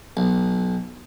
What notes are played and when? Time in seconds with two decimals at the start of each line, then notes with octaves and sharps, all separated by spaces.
0.17 B1